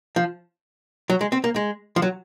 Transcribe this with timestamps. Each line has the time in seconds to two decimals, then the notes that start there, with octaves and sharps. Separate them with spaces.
0.16 F3
1.10 F#3
1.21 G#3
1.32 C4
1.44 A#3
1.56 G#3
1.96 F3
2.02 F#3